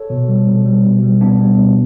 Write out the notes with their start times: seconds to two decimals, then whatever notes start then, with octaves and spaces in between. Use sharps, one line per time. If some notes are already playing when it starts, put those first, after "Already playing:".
Already playing: A4 C#5
0.10 B2
0.28 G3
0.47 B2
0.65 G3
0.84 B2
1.03 G3
1.21 B2 B3 D4
1.40 G3
1.58 B2